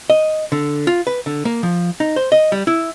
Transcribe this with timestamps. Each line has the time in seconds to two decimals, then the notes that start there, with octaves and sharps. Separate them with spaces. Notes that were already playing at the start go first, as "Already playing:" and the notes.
0.10 D#5
0.52 D3
0.87 F4
1.07 B4
1.26 D3
1.45 A#3
1.63 F3
2.00 D#4
2.16 C5
2.32 D#5
2.52 G3
2.67 E4